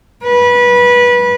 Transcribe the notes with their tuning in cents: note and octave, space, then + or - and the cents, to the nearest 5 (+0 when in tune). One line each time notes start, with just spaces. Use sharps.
B4 -20